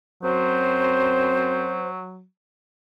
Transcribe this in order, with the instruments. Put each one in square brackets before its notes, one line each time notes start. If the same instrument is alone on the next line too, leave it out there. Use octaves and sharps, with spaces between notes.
[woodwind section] F#2 C4 C5 [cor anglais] F#3